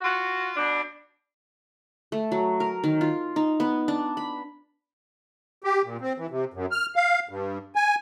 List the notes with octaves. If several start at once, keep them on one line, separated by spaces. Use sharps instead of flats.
F4 F#4
B2 D4
A3
F#3
A#4
D#3
F4
D#4
B3
D4
B5
G4
A#2
C4
E3
C3
F#2
F6
F5
G2
G#5